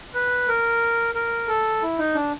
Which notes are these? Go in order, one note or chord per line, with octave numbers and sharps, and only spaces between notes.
B4
A#4
A#4
A4
E4
D#4
D4